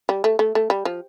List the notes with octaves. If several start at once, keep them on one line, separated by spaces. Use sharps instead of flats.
G3
A3
A3
A3
G3
F3